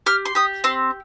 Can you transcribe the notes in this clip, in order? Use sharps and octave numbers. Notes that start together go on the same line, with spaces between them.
G4 F6
C6
G4 D#6
C4 C6